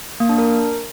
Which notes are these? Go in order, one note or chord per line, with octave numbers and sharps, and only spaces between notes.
A#3
D4
A#4